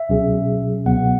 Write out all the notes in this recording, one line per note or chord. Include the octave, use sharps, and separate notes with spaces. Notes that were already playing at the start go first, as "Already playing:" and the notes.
Already playing: E5
C#2 B2 F#3 C#4 G#4
C#2 B2 F#3 B3 F#5